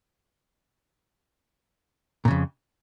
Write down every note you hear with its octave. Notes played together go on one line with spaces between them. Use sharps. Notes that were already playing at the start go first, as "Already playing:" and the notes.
F2 A#2 C#3